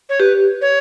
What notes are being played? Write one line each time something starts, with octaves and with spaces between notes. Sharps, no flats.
C#5
G4 B4
C#5